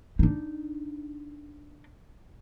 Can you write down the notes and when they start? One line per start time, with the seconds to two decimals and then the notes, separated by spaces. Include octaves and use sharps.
0.19 D4 D#4